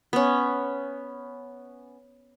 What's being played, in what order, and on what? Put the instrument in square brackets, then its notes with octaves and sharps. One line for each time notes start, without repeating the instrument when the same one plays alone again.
[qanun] B3 C#4